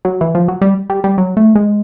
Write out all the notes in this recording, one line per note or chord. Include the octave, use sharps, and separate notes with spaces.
F#3
E3
F3
F#3
G3
G3
G3
F#3
A3
G#3